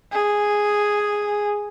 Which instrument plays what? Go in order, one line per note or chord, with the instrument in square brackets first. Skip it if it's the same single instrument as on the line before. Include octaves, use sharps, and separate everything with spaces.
[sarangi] G#4